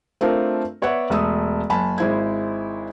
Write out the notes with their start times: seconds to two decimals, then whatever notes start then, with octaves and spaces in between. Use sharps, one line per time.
0.21 A3 C4 D4 F4 A#4
0.82 B3 C#5 D5 E5 F#5
1.10 E1 A3 D#6 E6
1.70 F#1 G#5 A5 B5
1.98 G#1 G#3 E4 C5 G#6